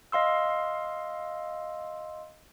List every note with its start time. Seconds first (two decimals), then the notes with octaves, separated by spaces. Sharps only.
0.12 D#5 F5 C6 E6